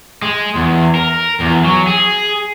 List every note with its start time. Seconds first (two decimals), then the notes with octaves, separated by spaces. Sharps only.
0.22 G#3
0.55 E2
0.95 A#4
1.40 E2
1.64 F#3
1.87 G#4